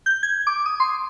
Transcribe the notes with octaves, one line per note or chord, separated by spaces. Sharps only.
G6
G#6
D6
D#6
C6